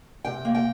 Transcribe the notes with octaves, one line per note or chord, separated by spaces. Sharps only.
C3 G5
A#3
G5